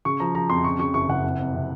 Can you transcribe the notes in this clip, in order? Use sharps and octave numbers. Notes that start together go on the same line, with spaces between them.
C#3 C#6
F3 A#5
F3 A#5
F2 C6
C#3 C#6
C#3 C#6
F#1 C#6
F#1 F#5
F2
F2
C3